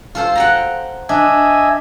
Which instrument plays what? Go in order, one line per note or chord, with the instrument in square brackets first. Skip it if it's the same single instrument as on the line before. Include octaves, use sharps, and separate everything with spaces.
[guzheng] F4 A4 C5
F#5 G5 A#5
[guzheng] D4 [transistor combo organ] D#5 E5 G#5